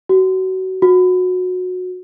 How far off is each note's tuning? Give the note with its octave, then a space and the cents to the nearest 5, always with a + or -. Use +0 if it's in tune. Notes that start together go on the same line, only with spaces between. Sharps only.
F#4 +25
F#4 -20